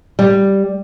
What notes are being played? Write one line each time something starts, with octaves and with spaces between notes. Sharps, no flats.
G3